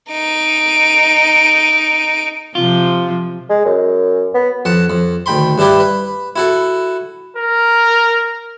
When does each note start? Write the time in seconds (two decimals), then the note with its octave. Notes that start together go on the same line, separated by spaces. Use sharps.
0.12 D#4 D7
2.55 C3 F3 F4
3.50 G#3
3.66 F#2
4.34 B3
4.65 F2 F#5 A5
4.90 F2
5.26 D2 D#3 G5 B5 C6
5.58 G2 D4 E4 G4 B4
5.80 B4
6.36 E4 F#4 A4
7.37 A#4